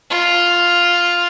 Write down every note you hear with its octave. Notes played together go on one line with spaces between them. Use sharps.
F4